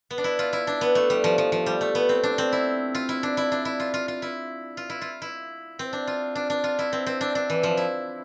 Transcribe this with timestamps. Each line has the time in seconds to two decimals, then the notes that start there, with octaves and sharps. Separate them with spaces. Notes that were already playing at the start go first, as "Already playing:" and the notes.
0.11 B3
0.18 D4
0.24 E4
0.39 F4
0.53 E4
0.67 D4
0.81 B3
0.95 A3
1.10 G3
1.24 F3
1.38 F3
1.52 F3
1.66 G3
1.81 A3
1.95 B3
2.09 C4
2.23 D4
2.38 C4
2.52 E4
2.95 F4
3.09 E4
3.23 D4
3.37 E4
3.52 D4
3.65 E4
3.80 F4
3.94 F4
4.08 F4
4.22 E4
4.77 F4
4.90 E4
5.01 F4
5.22 E4
5.79 C4
5.93 D4
6.07 F4
6.35 D4
6.50 D4
6.64 F4
6.79 E4
6.93 C4
7.06 C4
7.21 D4
7.35 D4
7.50 E3
7.63 F3
7.77 E4